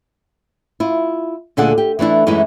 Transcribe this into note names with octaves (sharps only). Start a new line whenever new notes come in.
E4 F4
D2 A#2 D3 G#4 A4 F#5
G4
E3 A3 D4 E4
F#2 E3 G#3 A3 D#4 E4